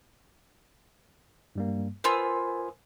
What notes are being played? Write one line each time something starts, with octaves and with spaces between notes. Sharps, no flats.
G2 G3 A#3
B3 F4 A#4 C5 G#5 E6